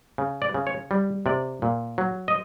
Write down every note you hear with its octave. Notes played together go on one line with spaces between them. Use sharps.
C#3
D5
C#3
C#5
G3
C3 D5
A#2
F#3
D#5